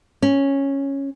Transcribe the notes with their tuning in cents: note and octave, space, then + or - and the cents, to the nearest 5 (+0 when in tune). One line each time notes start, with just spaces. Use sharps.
C#4 -5